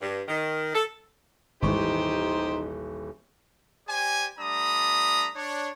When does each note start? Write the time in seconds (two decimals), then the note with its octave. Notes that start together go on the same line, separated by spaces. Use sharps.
0.02 G2
0.28 D#3
0.74 A4
1.63 D#1 G#1 E3 D#4 G4 C5 C#6
3.88 G4 C5 D5 G#5
4.39 G3 A3 D4 A#5 B5 D#6
5.35 D4 C#5